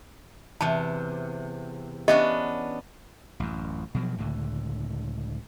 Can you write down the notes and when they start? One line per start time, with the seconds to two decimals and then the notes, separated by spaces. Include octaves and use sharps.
0.61 E2 C3 A5
2.08 B3 C#4 D4 G4 D#5 E5
3.40 A1 F#2
3.94 B2 F3 F#3
4.18 C#2 A2 D3